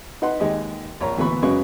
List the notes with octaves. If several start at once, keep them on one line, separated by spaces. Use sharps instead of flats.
D#4 B4 F#5 C6
D#2 G#3 D#4 G4
A#1 C#5 A#5
D2 A#2 E3 B3 B5 C#6
F#2 C#3 F#3 G#3 B4 C#6